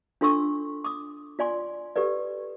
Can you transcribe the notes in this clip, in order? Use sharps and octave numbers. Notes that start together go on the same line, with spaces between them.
D4 F4 A4 C6 C#6 E6
D6 D#6
F4 D5 G#5 C6
G4 A4 B4 D5